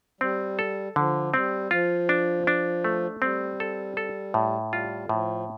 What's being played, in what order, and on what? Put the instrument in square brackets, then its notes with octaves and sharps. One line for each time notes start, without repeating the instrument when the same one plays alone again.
[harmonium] G3 [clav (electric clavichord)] C4
[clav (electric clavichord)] A4
[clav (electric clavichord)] D3 [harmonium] F3
[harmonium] G3 [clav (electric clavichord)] C4
[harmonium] F3 [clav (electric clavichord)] F4
[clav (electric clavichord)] D4
D4
A3
[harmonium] G3 [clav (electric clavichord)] C4
[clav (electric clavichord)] A4
A4
A2
[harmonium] G3 [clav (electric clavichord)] F4
[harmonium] D3
[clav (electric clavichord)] A2 [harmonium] F3